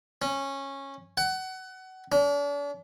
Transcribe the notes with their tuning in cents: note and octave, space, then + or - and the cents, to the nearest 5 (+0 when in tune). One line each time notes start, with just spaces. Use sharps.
C#4 -15
F#5 +25
D4 -40